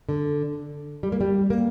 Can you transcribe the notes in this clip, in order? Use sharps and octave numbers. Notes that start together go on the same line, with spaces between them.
D3
G3
A#3
G3
A#3